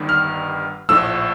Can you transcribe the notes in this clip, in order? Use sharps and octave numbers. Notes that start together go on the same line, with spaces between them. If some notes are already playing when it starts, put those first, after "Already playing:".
Already playing: G1 G2 D#3 G3
F6
A#1 A2 F3 A3 E6